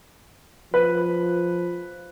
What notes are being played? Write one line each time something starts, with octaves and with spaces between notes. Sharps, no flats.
F3 B4